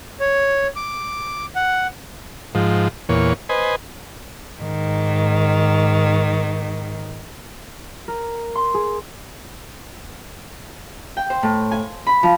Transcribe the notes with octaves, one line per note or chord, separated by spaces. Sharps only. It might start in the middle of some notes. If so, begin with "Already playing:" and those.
C#5
D6
F#5
G#2 F3
E2 A#2 C#5
B4 C5 D#5 G#5
G#2 D#3
A#4
C6
G#4
G5
C5
A2
G#5
B5
F3